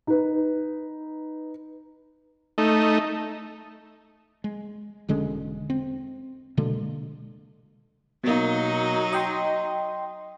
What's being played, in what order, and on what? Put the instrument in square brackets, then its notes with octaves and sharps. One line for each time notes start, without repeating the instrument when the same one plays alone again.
[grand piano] D#4 B4
[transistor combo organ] A3 D#4
[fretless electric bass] G#3
E1 D3 G#3 C#4
C4
B2 D3 G#3 A#3
[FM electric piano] B2 A#3 [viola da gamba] F#3 D#4
[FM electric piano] D#5 G5 C6